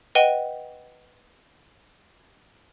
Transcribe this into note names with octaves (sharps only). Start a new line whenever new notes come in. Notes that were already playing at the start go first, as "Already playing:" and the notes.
B4 D#5 F#5 G5 D#7 G7